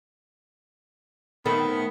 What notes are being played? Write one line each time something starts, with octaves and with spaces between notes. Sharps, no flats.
D#3 A3 B3 C4